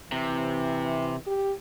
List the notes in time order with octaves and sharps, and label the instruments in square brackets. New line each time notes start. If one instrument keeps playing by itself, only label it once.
[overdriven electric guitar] C3 [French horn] E3
[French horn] G4